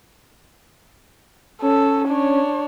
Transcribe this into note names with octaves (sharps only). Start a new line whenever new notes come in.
C#4 A4
D4 C#5